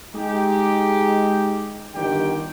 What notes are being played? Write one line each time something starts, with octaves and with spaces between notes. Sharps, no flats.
G#3 D#4 G4
G1 D3 D#3 G4 G5